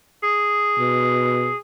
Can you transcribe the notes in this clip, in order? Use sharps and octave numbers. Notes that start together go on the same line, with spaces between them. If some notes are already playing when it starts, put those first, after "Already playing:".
G#4
B2